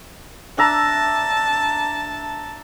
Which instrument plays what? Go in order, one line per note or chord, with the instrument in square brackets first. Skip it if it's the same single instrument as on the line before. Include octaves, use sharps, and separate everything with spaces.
[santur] D4 E5 A#5 [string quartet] A5